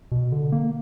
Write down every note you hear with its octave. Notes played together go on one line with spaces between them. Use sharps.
B2
D3
A#3